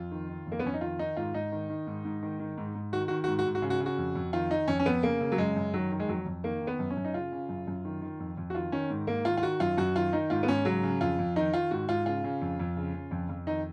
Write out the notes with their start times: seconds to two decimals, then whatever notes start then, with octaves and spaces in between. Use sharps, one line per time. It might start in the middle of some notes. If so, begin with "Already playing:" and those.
Already playing: F2 F4
0.11 D#3
0.29 D#3
0.47 F2
0.52 A#3
0.59 B3
0.64 F2 C#4
0.74 D#4
0.81 D#3 F4
0.99 D#3 D#4
1.17 G#2 F4
1.34 G#2 D#4
1.52 D#3
1.69 D#3
1.87 G#2
2.05 G#2
2.23 D#3
2.39 D#3
2.57 G#2
2.75 G#2
2.92 D#3 F#4
3.08 D#3 F#4
3.24 F#4
3.28 G#2
3.39 F#4
3.46 G#2
3.55 F#4
3.62 C#3
3.70 F#4
3.80 C#3
3.86 F#4
3.98 F2
4.15 F2
4.33 D#3 F4
4.50 D#3 D#4
4.68 F2 C#4
4.79 C#4
4.86 F2 B3
5.03 C#3 A#3
5.21 C#3
5.32 F#3
5.38 F#2 G#3
5.56 F#2
5.74 D#3 F#3
5.91 D#3
6.00 G#3
6.09 F2 F#3
6.26 F2
6.44 D#3 A#3
6.61 D#3
6.67 B3
6.79 F#2
6.90 C#4
6.97 F#2
7.05 D#4
7.14 C#3 F4
7.32 C#3
7.49 F#2
7.67 F#2
7.85 D#3
8.02 D#3
8.20 F2
8.37 F2
8.50 F#4
8.55 D#3 F4
8.72 D#3 C#4
8.90 G#2
9.07 G#2 A#3
9.25 D#3 F4
9.37 F4
9.43 D#3 F#4
9.60 F#2 F4
9.77 F#2 F#4
9.95 D#3 F4
10.13 D#3 D#4
10.30 G#2 F4
10.43 B3
10.48 G#2 C#4
10.65 C#3 F#3
10.83 C#3
11.01 F2 F4
11.19 F2
11.36 D#3 D#4
11.53 D#3 F4
11.71 G#2 F#4
11.89 G#2 F4
12.06 C#3 F4
12.24 C#3
12.41 F2
12.59 F2
12.77 C#3
12.94 C#3
13.11 F2
13.29 F2
13.47 D#3 D#4